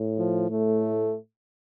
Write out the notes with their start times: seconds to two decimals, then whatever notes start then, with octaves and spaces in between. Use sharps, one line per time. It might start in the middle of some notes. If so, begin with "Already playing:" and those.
Already playing: A2
0.18 F3
0.50 A2 A3